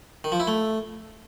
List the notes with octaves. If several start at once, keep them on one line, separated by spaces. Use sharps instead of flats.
D#3
F3
E4
A3